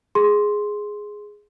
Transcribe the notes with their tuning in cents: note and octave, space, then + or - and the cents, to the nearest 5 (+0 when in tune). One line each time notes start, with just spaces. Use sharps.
G#4 +0 C6 +0